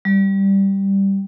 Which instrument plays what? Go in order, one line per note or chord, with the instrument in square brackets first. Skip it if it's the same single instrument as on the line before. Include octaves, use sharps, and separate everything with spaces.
[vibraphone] G3